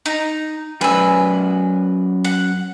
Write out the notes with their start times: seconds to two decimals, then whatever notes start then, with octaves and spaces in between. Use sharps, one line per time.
0.06 D#4
0.81 F#2 B4 G#5 E6
2.25 F#5